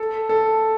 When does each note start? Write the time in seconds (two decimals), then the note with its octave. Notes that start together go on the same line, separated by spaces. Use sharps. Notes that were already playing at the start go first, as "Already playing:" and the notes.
Already playing: A4
0.29 A4